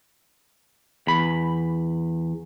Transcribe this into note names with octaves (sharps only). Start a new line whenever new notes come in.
E2 B5